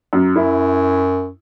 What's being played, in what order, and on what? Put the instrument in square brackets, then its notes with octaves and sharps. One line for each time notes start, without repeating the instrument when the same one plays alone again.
[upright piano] F#2
[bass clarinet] F#2 [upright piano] E4